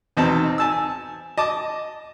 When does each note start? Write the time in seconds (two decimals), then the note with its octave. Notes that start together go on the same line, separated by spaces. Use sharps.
0.17 E2 B2 C4 D#4 A5
0.58 G#5 A5 E6
1.38 D#5 A5 D6